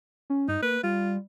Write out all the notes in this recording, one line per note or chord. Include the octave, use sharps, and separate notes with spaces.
C#4
G2 D#4
A#3 B4
G3 F4